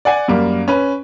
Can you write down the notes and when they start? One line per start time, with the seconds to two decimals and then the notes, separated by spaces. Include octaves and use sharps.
0.05 D5 F#5 G#5
0.28 F#2 G3 A#3
0.68 C#4 B4